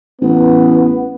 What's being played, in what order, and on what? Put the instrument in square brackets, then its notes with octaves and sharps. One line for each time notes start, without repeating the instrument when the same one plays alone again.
[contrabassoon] A1 [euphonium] B3